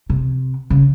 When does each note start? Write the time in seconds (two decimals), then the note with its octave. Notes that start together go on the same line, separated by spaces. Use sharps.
0.10 C3
0.70 C#3